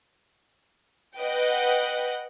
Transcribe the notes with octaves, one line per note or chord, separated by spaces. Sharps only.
B4 D#5 F#5 G5